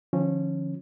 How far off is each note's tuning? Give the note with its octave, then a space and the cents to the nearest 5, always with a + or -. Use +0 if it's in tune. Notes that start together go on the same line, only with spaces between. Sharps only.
D3 +40 F3 +0 C#4 -20